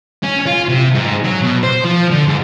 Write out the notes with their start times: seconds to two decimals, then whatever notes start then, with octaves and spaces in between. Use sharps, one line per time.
0.23 C#4
0.46 F4
0.69 C3
0.95 G#2
1.24 F#3
1.42 B2
1.63 C5
1.85 F3
2.10 D3
2.27 G#2